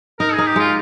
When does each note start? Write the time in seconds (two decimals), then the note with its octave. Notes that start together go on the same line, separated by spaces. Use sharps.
0.20 D#4 A#4
0.33 G#4
0.38 D#4
0.47 G4
0.56 G#3 F4